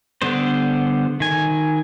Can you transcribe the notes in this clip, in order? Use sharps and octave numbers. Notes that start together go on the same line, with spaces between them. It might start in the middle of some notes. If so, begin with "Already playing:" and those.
D3 G3 B3 C5
D#3 G#5